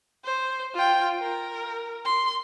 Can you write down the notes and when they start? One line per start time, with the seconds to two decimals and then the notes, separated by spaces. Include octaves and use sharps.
0.24 C5
0.74 F4 G5
1.20 A#4
2.05 C6